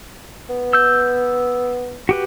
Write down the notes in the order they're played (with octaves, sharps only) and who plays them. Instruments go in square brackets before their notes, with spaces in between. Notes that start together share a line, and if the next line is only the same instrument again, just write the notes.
[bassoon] B3
[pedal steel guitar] E6 G6
F#4 G4 B4